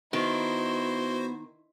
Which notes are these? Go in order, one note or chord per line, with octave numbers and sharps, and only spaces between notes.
D#3 B3 E4 F#4 C5 C6